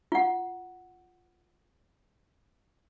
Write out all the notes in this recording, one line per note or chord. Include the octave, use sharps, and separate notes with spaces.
F4 F#5